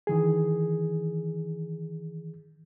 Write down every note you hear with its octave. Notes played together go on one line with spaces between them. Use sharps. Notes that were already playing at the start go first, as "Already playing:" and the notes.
D#3 E3 G#4